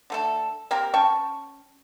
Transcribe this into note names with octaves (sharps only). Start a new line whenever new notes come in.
D3 A3 A4
A#3 C4 G4 A#4
C#4 G5 A5 C#6